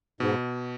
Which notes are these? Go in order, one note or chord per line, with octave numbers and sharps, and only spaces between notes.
G#2 B2